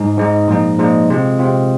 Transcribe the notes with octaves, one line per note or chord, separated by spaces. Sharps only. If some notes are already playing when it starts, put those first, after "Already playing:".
Already playing: G#2 G#3 D#4
G#2 G#3 D#4
A#2 F3 G#3 D#4
A#2 F3 G#3 D#4
C3 G#3 C4 F4
C3 G#3 C4 F4